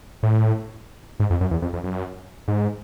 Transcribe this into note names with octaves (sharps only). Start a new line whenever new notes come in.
A2
G#2
F2
F#2
E2
F2
F2
F#2
G#2